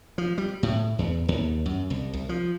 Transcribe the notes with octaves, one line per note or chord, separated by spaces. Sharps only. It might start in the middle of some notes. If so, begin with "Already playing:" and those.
F3
G3
A2
E2
D#2
F#2
C2
C2
F3